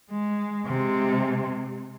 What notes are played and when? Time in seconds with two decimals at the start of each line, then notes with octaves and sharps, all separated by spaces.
0.10 G#3
0.66 C3 G#3